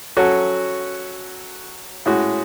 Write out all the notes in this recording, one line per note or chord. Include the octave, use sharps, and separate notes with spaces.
F#3 C#4 F#4 A4
A2 G#3 C#4 F#4